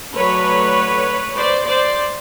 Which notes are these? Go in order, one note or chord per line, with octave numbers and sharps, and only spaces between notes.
F#3 A3 D4 B4 C#5
C5 D5
C5 D5